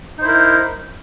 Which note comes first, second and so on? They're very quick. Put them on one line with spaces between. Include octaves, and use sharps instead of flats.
D#4 C5 E4 A#4